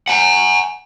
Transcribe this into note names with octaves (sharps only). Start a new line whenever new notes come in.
F#5 G#5